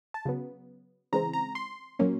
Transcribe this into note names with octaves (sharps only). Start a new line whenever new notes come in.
A5
C#3 F#3 B3
C#3 E3 G#3 C4 A#5
A#5
C6
A#2 F#3 A#3 C#4